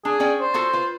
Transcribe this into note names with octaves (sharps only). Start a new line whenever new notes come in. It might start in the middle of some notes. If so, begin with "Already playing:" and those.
D4 G#4
C#4 D5 G5
C5
F4 F#4 A4
F4 B4